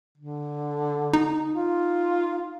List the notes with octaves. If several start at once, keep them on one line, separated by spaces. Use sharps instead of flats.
D3
D#4
F4